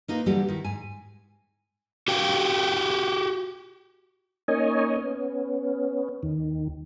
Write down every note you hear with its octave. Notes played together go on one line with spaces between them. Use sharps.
A#3 D#4 F4 B4
D3 E3 F#3 G3 B3 G4
D#3 E4
G#2 G#5
F#4 G4 F5 G5
A#3 C#4 D#4 C#5 D#5 G#5
B3 C#4
D#2 D#3